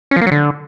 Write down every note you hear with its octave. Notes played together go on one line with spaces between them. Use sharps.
C#4
F3
A#3
F#3
D3